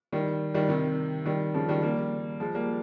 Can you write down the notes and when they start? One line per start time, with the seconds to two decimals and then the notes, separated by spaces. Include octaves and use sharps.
0.12 D#3 G3
0.54 D#3 G3
0.69 C3 D#3
1.25 D#3 G3
1.54 C#3 F3
1.69 D#3 G3
1.82 G3 A#3
2.40 F3 G#3
2.54 G3 A#3